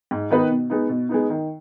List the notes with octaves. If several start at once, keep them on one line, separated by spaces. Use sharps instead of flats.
G#2
D#3 B3 D#4 B4
B2
G#3 B3 D#4
B2
G#3 B3 D#4
D#3